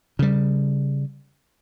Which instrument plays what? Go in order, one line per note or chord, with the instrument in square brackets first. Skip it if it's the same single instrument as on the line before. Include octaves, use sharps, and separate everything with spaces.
[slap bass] C#3 G3